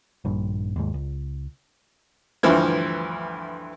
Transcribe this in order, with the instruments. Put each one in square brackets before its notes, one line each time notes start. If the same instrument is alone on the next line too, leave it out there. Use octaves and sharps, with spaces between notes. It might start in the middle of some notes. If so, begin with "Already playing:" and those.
[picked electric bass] A#1 G2
D#2 G#2
C#2
[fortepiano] D2 G2 E3 F3